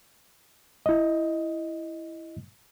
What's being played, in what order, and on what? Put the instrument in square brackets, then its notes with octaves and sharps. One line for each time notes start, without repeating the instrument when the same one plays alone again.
[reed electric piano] E4 D#5